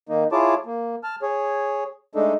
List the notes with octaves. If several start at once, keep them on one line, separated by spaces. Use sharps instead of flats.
D#3 A#3 D#4
E4 F4 G#4 C#5 A5 D6
A#3
A5 F6
G#4 C#5
G#3 A3 D4 D#4 A4